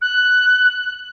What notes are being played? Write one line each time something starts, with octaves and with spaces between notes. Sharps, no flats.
F#6